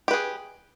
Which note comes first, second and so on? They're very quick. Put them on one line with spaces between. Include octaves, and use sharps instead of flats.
G4 B4 G#4